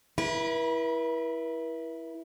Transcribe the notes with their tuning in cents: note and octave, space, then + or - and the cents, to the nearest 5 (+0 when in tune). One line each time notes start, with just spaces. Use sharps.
E4 +0 B4 -45